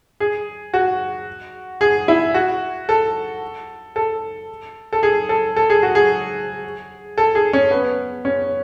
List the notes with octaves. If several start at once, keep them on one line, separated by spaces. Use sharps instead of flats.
G#4
F#4
G#4
E4
F#4
A4
A4
A4
G#4
A4
A4
G#4
F#4
G#4
A4
G#4
C#4
B3
C#4